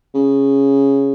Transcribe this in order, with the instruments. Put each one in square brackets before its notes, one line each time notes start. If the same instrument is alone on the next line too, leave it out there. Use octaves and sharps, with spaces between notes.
[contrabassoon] C#3